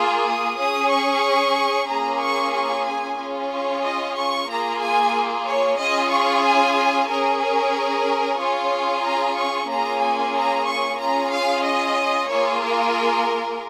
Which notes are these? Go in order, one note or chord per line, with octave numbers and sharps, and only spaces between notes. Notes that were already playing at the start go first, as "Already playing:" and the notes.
Already playing: A#3 F4 G#4
D#6
C#4 G#4 D#6
C#6
A#3 C#4 F4 G#4 A#5
C#6
C#6
G#5
C#4 F4 G#4
C#5
D#5
C#6
A#3 F4 G#4 A#5
G#5
C#5
C#4 F4 G#4 D#5
C#6
G#5
C#4 G#4 A#4
A#4
C#4 F4 G#4 C#5
A#5
C#6
A#3 C#4 F4 G#4 A#5
G#5
A#5
C#6
C#4 F4 G#4 A#5
F5
D#5
A#3 F4 G#4 C#5
A#4